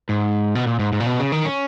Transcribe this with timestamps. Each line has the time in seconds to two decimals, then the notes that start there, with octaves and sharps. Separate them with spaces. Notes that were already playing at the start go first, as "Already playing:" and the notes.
0.09 G#2
0.55 B2
0.67 A#2
0.79 G#2
0.93 G#2
1.00 A#2
1.06 B2
1.19 C#3
1.32 D#3
1.45 C#4